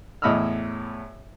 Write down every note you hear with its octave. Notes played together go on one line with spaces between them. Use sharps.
E2 A2 D#5 B5 E6 F6